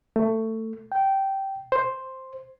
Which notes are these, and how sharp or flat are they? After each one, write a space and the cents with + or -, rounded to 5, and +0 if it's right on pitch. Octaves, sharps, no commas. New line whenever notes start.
A3 +20
G5 -15
C5 +5